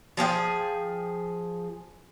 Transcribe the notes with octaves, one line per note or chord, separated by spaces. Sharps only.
F3 G#4 F5 G5